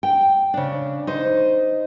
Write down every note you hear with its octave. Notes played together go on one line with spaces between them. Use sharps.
G5
C#3 D4
D#4 C5